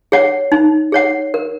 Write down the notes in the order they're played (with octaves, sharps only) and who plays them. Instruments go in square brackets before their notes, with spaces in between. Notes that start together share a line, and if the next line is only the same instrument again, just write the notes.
[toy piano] G#4 C#5 F#5
D#4
G#4 C#5 F#5
A#4